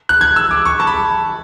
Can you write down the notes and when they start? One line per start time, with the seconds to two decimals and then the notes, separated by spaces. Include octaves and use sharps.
0.09 F#6
0.21 G#6
0.36 E6
0.51 D6
0.65 C#6
0.80 A5
0.87 B5